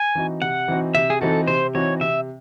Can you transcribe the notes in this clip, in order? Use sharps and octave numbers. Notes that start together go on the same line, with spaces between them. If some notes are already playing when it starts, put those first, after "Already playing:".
Already playing: G#5
E3 C4 D#4 F#4
C3 F#5
E3 C4 D#4 F#4
C3 E5
G#4
E3 C4 D#4 F#4 A4
C3 C5
E3 C4 D#4 F#4 C#5
C3 E5